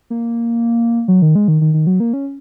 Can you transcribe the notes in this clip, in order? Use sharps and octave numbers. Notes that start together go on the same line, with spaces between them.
A#3
F#3
D#3
G#3
D#3
D#3
D#3
F#3
A#3
C#4